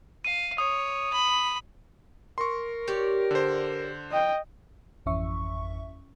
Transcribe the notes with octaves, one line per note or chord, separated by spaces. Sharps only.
F5 D#7
C#5 D#6
B5
A#4 C6 C#6
G4 C#5 D5
D3 C5
D#5 G5
G#1 F2 E3 C#4 E5 C#6